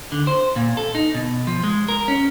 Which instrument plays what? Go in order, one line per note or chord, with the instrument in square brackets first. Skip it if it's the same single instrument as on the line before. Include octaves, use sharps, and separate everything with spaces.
[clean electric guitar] D3
C5
A#2
A4
D#4
B2
F3
G#3
A#4
C#4